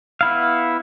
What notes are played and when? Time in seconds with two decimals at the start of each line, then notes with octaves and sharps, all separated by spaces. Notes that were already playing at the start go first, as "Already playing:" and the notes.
0.21 B3 E4 F5